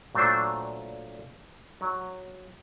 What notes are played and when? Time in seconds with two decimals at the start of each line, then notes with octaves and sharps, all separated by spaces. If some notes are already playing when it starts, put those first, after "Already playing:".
0.15 A#2 F#3 A3 D4 C5
1.81 F#3